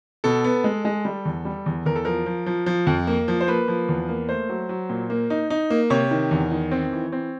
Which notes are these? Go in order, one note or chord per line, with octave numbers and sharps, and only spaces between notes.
B2 A4
B3
G#3
G#3
G3
E2
G3
E2
E2 A#4
A4
F3 A#4
F3
F3
F3
F2
A#3
F3
C5
A#3 B4
F3
E2
A#3
A3 C5
F#3
F#3
A#2
A#3
D#4
D#4
A#3
C3 C#5
D#3
E2
D#3
C4
E3
C4